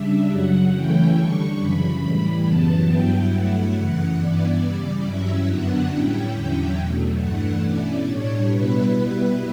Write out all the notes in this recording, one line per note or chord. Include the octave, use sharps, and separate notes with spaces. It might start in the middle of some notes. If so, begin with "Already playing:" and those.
Already playing: C#3 G3 D4 E5
F#2 C#3 F#3 F#5
C#3 E3 A3 C#4 E4 G5
D3 G3 D4 C#6
F#2 C#3 E3 B5
A2 E3 G3
F#2 C#3 E3 B3 A5
G2 F#3 B3 E4 G5
G2 F#3 A3 E4 F#5
F#2 C#3 E3 F#5
G2 E3 B3 E4 D5
C#3 E3 G3 D5
G2 F#3 C#4 E4 E5
F#2 D3 F#3 B3 D4 F#5
A2 G3 C#4 E4 G5
E2 D3 F#3 C#4 E4
E2 B2 F#3 A3
G2 E3 A3 D4 F#5
B2 A3 C#4 E4 D5
A2 G3 D4 C#5
B2 G3 B3 E4 B4
B2 G3 B3 E4 B4